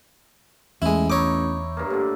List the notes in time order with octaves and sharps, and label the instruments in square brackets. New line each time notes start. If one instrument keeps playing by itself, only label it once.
[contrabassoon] A1 [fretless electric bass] E2 [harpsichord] G#3 E4
[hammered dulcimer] D#4 E4 [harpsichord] C#5 D6
[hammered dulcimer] G2 A#3
A2 D3